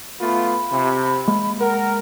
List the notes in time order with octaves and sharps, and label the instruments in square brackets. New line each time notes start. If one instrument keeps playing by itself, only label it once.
[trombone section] A3 B3 F4 [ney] B5
[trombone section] C3
[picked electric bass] G#3 A#3
[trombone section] A#4 [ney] F#5